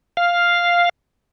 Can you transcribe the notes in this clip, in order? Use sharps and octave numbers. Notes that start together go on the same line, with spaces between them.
F5